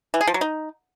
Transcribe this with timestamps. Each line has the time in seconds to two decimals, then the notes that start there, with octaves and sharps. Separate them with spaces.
0.14 E3
0.21 G#4
0.27 F3
0.34 F#3
0.41 D#4